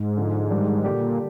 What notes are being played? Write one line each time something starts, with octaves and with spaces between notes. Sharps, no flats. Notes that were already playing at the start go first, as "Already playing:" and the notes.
Already playing: G#2
D3 F3 G#3
G2 D#3 G3 D4 G4
A#2 D3 G3 A#3 D4 G4